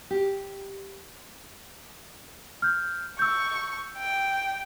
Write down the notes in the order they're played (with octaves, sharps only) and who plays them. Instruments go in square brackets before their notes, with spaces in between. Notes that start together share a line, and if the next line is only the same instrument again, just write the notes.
[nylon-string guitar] G4
[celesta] F6 G6
[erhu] C#6 [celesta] E6 G6
[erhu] G5